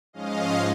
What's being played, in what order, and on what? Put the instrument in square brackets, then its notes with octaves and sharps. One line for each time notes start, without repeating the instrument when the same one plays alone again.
[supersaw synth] G#2 F3 G#3 C#4 D#5 F5